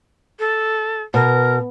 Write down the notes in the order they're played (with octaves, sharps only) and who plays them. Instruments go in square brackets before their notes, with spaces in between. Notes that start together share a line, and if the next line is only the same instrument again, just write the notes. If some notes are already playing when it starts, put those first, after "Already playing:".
[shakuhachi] A4
[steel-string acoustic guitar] B2 [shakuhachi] A#4